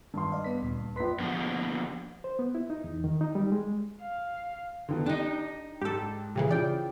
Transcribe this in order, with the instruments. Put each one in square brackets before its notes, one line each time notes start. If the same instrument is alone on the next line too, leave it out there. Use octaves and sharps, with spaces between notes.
[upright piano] G2 C6 [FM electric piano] D#3
[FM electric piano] D5 D#5 F5
B3 B4 B6
D2 A#2
[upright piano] A#1 B4 [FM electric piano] C6 B6
[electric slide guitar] D3 F3 A#3 B3 D4
[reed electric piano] C5
B3
E4
D#4
E2
D#3
D#4
G3
G#3
[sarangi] F5
[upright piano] D3 D#3 B3
[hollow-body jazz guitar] D4 D#4 [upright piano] G4
[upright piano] G#2 [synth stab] G4 A4
[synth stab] A#2 C#3 E3 [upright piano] G4 G#4
[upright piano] C#3 E3 F3 [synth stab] D5 G5